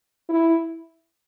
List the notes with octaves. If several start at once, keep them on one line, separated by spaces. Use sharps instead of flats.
E4